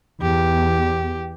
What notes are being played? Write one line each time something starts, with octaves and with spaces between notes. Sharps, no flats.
E2 G4